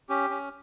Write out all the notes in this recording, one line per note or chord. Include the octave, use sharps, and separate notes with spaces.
C#4 G4
C#4